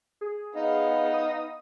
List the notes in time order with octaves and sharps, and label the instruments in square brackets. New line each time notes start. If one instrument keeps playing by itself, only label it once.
[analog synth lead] G#4
[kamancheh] B3 F5 [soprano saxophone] D#4
[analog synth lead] D#6